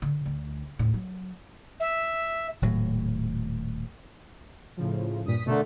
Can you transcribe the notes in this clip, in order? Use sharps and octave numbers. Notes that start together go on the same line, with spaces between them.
D3
D2
D#2 A2
F#3
E5
D#1 A2 F#3
A2 C#3 F3
G2 A#2 D#6 B6
B2 D3 A3 A4 A#4